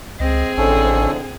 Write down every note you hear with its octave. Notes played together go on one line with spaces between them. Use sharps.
C#2 C4 G#4 D#5
A1 F2 A2 D3 C#4 A4